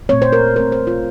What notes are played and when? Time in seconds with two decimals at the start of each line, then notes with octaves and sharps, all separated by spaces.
0.09 A#2 A3 C4 C#5
0.22 C5
0.33 A#4
0.56 A#2 A3 C4 A#4
0.72 C5
0.87 F4